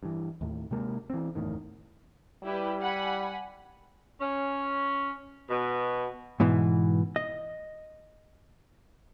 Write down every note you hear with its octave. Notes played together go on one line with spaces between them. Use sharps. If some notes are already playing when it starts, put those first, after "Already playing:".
G2 E3
D#2 A2
C3 G#3 A#3
E3 C4
F#1 E2 A2 D#3
G3 E4 G4 B4
F#5 G#5 B5
C#4
B2
G#2 B2 E3
D#5